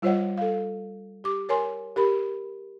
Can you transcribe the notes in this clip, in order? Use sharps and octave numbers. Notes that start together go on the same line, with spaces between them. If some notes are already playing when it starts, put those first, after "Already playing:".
G3 F4 C5 C#5 D#5 F#5
A4 F5
G4 D6
A#4 C#5 G#5 C6
G4 A#4 B5